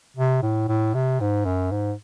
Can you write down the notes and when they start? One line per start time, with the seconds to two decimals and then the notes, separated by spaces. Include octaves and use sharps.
0.17 C3
0.42 A2
0.68 A2
0.94 C3
1.20 G#2
1.45 F#2
1.71 G#2